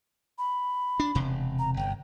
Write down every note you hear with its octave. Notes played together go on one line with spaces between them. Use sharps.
B5
D4
E1 C3
A#5
G1 G5